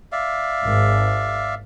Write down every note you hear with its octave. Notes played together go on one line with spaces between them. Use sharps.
D5 E5 F5
G#1